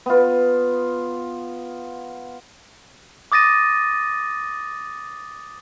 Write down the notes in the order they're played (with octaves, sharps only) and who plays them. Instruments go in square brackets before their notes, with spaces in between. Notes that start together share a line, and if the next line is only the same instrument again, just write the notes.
[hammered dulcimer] B3 F4
[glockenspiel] D6 D#6 A6 A#6 D#7